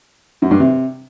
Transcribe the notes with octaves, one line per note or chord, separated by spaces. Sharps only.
F#2
G2
C3